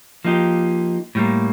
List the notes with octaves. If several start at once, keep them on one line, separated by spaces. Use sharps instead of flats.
F3 A#3 D#4 G4
A2 G3 A#3